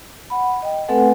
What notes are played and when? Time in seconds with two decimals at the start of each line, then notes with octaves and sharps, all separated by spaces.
0.30 F#5 B5
0.62 D#5 G5
0.88 A3 C4 A4 B4 F#5 G#5